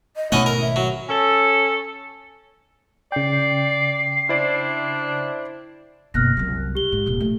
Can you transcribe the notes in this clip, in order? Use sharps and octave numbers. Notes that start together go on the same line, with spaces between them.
D#5
G#1 B2 A3 C#4 E4 D#5 F#5
A#4
E5
F#3
C#4 A4
C#3 D5 G5 C7
D4 E4 C5 D5
F#1 B2 F6 F#6 A#6
C2 F#3
G4 G7
G#2
D#1 C2
F3 A3